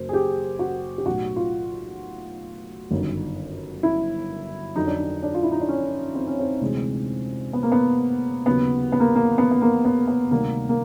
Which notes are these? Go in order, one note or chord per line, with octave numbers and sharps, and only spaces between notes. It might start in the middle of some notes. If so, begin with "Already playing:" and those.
Already playing: F#1 F#2 C5
G#4
G4
F#4
G4
B1 A2 F#3 F#4
F4
G1 F#2 D#3
E4
F2 D3 F#3 D#4
D4
D#4
D4
F4
E4
D#4
D4
C#4
C4
C#4
C4
D2 C3 E3 G#3
B3
A#3
B3
D#2 C#3 F#3 B3
B3
A#3
A#3
B3
B3
A#3
B3
B3
D2 C3 D#3 G3 A#3
A#3